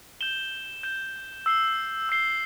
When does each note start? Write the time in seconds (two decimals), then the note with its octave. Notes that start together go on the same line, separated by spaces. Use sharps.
0.21 G6 E7 G7
0.83 G6 E7 G7
1.46 E6 C7 G7
2.09 E6 C7 G7